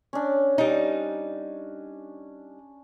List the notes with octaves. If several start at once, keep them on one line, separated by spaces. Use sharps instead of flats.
C#4 D4
G3 D#4